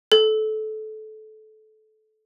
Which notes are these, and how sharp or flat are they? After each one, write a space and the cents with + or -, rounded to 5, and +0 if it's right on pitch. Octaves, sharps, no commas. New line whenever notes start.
A4 -25